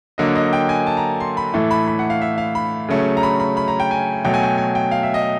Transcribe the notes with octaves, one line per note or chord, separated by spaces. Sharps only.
D3 F#3 A#3 D#5
D#5
G5
G#5
A5
A#5
C6
B5
A2 E3 A3
B5
B5
F#5
F5
E5
F5
B5
C#3 F#3 A3 C#4
A#5
B5
B5
B5
A#5
G5
G#5
B2 F#3 A3 G5
G#5
G5
G#5
G5
F5
E5
D#5